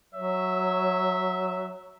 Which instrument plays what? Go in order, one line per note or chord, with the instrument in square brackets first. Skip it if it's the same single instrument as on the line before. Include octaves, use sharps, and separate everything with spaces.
[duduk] F#3 [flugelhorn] C#5 [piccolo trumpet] E5